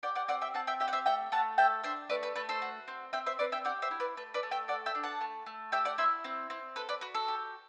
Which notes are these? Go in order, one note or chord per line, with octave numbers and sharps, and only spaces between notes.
G4 D5 F#5
D5 F#5
C4 D5 F#5
E5 G5
C4 F#5 A5
E5 G5
G4 E5 G5
F#5
C5 E5
A3 E5 G5
A3 F#5 A5
A4 E5 G5
D4 C5 E5
A3 B4 D5
B4
A3 B4
A4 C5
F#4
C4
C4 E5 G5
C5 E5
C4 B4 D5
E5 G5
G4 D5 F#5
C5 E5
E4
B4 D5
A3 B4
B4 D5
A3
E5 G5
A4 D5 F#5
E5 G5
D4
F#5 A5
A3
A3
G4 E5 G5
D5 F#5
E4 C5 E5
C4
C4
A4 B4
B4 D5
F#4 B4
A4
G4